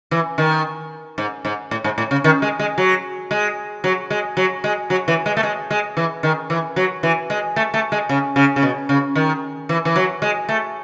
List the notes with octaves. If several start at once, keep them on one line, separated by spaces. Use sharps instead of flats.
E3
D#3
G#2
G#2
A2
G#2
A2
C#3
D#3
G#3
G#3
F#3
G#3
F#3
G#3
F#3
G#3
F#3
E3
G#3
A3
G#3
G#3
E3
D#3
E3
F#3
E3
G#3
A3
A3
G#3
C#3
C#3
C#3
B2
C#3
D#3
E3
E3
F#3
G#3
A3